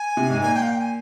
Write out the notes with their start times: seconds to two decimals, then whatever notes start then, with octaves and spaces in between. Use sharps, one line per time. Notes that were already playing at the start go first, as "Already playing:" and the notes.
Already playing: G#5
0.17 C3
0.30 G#2
0.42 A#2 G#5
0.55 G5
0.62 F5
0.68 G5
0.80 G#5